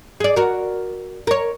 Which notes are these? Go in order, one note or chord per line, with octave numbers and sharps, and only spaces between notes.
G#4 D5
F#4 A#4
A#4 C#5